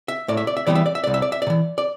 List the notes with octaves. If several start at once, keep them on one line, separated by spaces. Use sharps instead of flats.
E5
A2 D5
E5
D5
E5
E3 G3 B3 D5
E5
D5
E5
C2 D5
E5
D5
E5
C3 D5
E3
D5